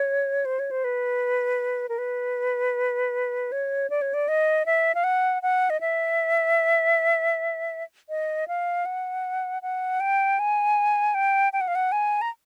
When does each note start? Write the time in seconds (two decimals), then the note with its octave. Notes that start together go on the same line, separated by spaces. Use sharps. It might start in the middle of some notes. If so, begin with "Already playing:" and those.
Already playing: C#5
0.45 C5
0.59 C#5
0.71 C5
0.84 B4
1.89 A#4
1.98 B4
3.52 C#5
3.90 D5
4.02 C#5
4.14 D5
4.28 D#5
4.66 E5
4.95 F5
5.04 F#5
5.42 F#5
5.70 D#5
5.81 E5
8.09 D#5
8.48 F5
8.86 F#5
9.62 F#5
10.00 G5
10.39 G#5
11.14 G5
11.53 G5
11.61 F#5
11.68 F5
11.75 F#5
11.92 G#5
12.21 A#5